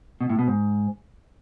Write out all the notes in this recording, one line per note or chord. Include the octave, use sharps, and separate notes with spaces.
B2
A2
B2
G#2